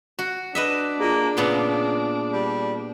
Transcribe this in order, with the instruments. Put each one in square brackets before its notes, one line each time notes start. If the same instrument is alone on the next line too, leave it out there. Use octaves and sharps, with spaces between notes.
[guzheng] F#4
[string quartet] D4 [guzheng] B4 D#5 E5
[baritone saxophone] A#3 [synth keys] F4 G#4
[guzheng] A#2 B3 C6 [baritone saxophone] C#3
[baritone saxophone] G3